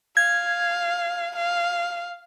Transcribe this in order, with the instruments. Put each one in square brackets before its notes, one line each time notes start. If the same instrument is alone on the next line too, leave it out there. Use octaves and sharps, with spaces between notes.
[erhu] F5 [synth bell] G#6
[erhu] F5